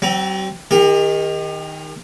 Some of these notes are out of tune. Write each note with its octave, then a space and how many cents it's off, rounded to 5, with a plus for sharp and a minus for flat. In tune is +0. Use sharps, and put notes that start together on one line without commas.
F#3 +45 C4 +0
D#3 +0 G4 +40